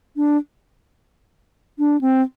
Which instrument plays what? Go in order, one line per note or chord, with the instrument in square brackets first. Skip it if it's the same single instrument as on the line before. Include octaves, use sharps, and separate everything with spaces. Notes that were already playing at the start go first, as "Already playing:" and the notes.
[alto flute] D4
D4
C4